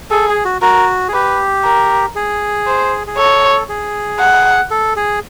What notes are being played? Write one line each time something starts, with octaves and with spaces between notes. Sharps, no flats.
G#4 A4
G#4
F#4
F#4 A#4
G#4
G4 B4
A#4
G#4
C5
G#4
A4 C#5
G#4
F#5
A4
G#4